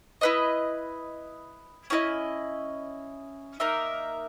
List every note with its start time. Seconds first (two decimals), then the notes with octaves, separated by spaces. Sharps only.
0.21 E4 B4 D#5
1.90 C#4 E4 A#4 D#5
3.60 A#3 D#4 A#4 E5